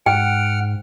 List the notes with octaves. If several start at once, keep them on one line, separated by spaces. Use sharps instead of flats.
G#2 F#5 G5 F6 D7